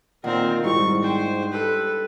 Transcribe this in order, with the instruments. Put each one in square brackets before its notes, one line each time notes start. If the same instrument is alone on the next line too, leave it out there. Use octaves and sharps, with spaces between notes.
[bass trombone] A#2 [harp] D#3 A#5 [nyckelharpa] C4 A#4 [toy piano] F#5
[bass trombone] G#2 [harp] G3 [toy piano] E4 F#4 [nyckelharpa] C#6
[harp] D4 G5 [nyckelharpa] C5
[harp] G4 E6 [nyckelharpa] A4 B4